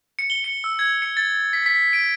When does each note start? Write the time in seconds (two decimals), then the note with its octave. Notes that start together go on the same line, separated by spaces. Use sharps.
0.19 C#7
0.30 G7
0.44 C#7
0.64 E6
0.79 G#6
1.02 C#7
1.17 A6
1.53 B6
1.66 B6
1.93 D7